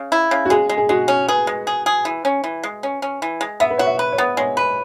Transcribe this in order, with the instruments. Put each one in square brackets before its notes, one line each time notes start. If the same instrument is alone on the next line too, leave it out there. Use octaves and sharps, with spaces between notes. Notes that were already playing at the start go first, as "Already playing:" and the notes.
Already playing: [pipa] C#3
E4
C#3
[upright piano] F#4
[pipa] G#3 [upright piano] G#4
[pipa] G#3
[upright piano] G#4
[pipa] G#3 [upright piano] F#4
[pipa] C#4
[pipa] G#4 [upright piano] B4
[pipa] G#3
G#4
G#4
E3
C#4
E3
G#3
C#4
C#4
E3
G#3
[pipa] B3 [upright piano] E5
[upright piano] B4
[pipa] F#4 [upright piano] C#5
[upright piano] E5
[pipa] B4
[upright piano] C#5
[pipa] B3
[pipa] G#3 [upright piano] C#5
[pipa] B4